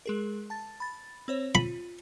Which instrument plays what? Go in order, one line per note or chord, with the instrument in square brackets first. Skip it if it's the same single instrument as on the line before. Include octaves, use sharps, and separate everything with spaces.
[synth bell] G#3 G#4 A#4
A5 A6
B5 A6
C4 C5 C#5
[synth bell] F4 [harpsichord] B5